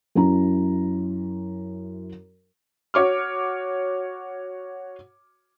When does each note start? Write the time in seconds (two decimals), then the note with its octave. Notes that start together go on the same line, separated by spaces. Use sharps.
0.15 F#2 C#4 E4 A#5
2.94 F#4 C#5 D6 F6